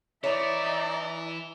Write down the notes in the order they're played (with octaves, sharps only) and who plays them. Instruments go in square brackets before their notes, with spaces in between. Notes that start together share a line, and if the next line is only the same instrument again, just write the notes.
[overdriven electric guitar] E3 E4 [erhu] D#4 [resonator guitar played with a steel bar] C#5 [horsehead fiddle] D5 E5